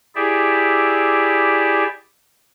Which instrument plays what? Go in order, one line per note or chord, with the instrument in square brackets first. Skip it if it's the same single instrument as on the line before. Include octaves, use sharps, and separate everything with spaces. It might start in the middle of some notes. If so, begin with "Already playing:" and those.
[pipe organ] E4 G4 G#4 D5 E5